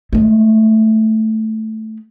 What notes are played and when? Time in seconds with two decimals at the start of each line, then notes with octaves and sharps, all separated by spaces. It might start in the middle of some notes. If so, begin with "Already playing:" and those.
0.13 G#3 A3